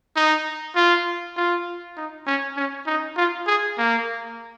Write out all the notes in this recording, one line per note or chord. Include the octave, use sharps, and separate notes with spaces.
D#4
F4
F4
D#4
C#4
C#4
D#4
F4
G#4
A#3